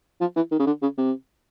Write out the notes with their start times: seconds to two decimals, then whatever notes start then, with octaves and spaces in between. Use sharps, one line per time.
0.21 F3
0.36 E3
0.51 D#3
0.59 C#3
0.67 D3
0.82 C#3
0.98 C3